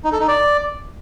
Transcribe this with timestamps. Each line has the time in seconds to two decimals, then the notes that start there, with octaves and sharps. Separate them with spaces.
0.04 D#4
0.12 A4
0.20 D#4
0.28 D5